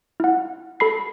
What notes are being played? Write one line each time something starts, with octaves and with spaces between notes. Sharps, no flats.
E4 F#5
A4 B5 C7